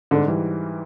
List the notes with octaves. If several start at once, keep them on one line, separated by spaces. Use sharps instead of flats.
G#2 D3
E3 G3